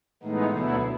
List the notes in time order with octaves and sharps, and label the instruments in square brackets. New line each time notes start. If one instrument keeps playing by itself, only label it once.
[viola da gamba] A2 [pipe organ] E3 G#3 B3 D#4
[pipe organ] D2 D3 F#3 B3 E4 [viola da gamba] B2